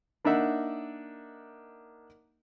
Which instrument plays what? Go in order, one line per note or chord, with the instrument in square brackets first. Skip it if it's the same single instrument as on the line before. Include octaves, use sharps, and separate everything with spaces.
[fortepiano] A#3 D4 D#4 E5 F#5